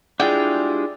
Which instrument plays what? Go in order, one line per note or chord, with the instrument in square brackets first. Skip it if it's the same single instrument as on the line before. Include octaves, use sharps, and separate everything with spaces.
[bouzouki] G3 G#3 F4 [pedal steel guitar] D4 E4 G#4 [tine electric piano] D5 [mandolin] G5